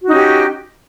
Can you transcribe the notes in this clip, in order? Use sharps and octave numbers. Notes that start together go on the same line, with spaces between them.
C#4 D#4 F#4 G4